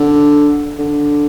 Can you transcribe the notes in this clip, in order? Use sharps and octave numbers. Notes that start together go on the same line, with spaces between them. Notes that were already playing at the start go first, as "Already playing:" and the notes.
Already playing: D3
D3